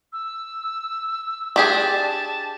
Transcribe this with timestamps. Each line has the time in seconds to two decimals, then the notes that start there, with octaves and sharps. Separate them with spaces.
0.13 E6
1.56 D4 G4 G#4 A5